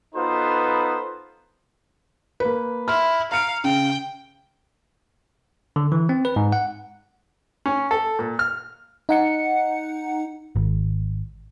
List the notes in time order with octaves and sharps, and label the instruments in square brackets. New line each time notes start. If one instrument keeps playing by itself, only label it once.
[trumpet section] B3 D#4 F4 A4 B4 C5
[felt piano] A#3 B4
[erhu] E4 [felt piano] C6 F6
[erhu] F5 [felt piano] A#5 C#7 D7
[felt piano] C#3 [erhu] G5
[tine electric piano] D3
E3
C4
B4
G#2
F#5
[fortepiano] C#4
A4
A#2
F6
[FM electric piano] D#4 F#5 C#7
[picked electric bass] G#1